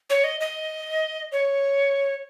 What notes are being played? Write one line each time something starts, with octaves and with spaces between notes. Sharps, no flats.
C#5
D#5
D#5
C#5